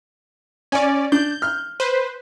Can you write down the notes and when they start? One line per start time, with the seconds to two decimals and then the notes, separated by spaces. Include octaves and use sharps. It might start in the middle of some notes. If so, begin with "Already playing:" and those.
0.72 C#4 D5 G#5
1.12 D4 G6
1.42 F6
1.80 B4 C5